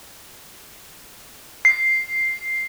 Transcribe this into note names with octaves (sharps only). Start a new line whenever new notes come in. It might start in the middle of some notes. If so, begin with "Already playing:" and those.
C7